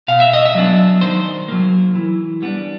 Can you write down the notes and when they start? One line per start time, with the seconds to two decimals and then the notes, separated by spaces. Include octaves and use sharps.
0.08 B2 F5
0.20 E5
0.33 D#5
0.45 E5
0.55 F#3 B3 D4
1.01 D#3 C5
1.48 F#3 A#3
1.95 E3
2.42 G3 B3 D4